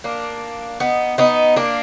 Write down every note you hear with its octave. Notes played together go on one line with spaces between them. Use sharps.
A#3 D4
B3 D#4
B3 D#4
A#3 D4